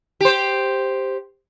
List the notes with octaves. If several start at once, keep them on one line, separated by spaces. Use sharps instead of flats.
G4 C5